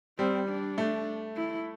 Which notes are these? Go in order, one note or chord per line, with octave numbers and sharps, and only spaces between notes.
G3 C4
D4
A3
E4